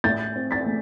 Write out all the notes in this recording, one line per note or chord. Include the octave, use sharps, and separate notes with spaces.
A2 G6 A6
C4
A6 B6
A3